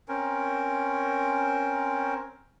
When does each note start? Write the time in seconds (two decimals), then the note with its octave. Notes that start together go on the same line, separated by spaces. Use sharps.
0.08 C4 C#4 A#4